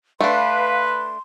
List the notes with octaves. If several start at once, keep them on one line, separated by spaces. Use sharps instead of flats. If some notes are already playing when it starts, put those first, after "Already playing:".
A3 D4 B4 F5 C6